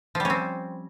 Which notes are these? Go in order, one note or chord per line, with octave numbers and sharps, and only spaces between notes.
F3 G3 C4 C#4